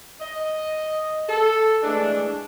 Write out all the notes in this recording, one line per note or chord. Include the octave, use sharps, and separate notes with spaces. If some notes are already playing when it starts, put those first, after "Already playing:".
D#5
A4
E3 G#3 A3 D4